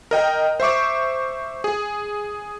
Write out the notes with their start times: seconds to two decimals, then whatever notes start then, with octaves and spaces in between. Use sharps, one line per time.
0.11 A#4 D#5 G5
0.60 C5 E5 C#6 D6
1.64 G#4